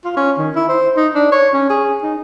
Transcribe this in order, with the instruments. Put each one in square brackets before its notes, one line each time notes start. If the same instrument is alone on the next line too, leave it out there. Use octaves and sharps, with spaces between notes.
[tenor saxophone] F4
C#4
D#3
E4
C5
D#4
D4
C#5
C#4
G#4
D#4